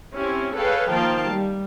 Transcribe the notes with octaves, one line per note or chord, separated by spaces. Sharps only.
C4 C#4 E4 G4
G#4 A4 B4 C#5 F5 G5
D#3 F3 A#3 F5 G5 A5
G3